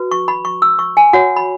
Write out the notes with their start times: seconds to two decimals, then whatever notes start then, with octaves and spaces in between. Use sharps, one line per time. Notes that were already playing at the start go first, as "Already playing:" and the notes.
Already playing: F#4 B4
0.11 C#6
0.28 B5
0.45 C#6
0.62 E6
0.79 C#6
0.97 G#5
1.13 F#4 C#5 F#5
1.36 B5